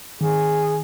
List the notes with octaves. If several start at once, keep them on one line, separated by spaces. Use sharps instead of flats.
D#3 G#4